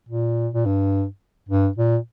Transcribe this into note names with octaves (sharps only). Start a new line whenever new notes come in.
A#2
A#2
G2
G2
A#2